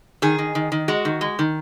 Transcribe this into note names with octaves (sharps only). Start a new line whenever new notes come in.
D#3 G#4
D#3
D#3
D#3
G#3 F#4
D#3
G#3
D#3